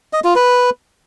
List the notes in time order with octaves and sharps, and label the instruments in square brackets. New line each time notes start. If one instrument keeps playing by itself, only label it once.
[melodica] D#5
F4
B4